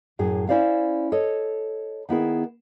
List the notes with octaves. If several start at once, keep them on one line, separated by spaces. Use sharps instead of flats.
F#2 A2 G#4
C#4 E4 C5 D5 F5
A4 C#5 D#5
D#3 B3 E4 G#4